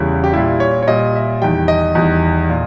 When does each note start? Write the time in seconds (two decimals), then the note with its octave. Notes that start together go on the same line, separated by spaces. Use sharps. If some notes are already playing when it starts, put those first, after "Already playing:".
Already playing: E2 C#3 G3 E4
0.24 G4
0.33 A#2 G3 E4
0.60 C#5
0.83 C#5
0.87 A#2 G3 D#5
1.15 E5
1.42 E2 D#3 G3 G5
1.68 D#5
1.95 E2 D#3 G3
2.49 A#2